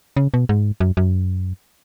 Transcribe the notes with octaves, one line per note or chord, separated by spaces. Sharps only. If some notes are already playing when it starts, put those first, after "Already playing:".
C#3
B2
G#2
F#2
F#2